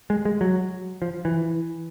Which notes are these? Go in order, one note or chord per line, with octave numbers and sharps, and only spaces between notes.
G#3
G#3
F#3
F3
E3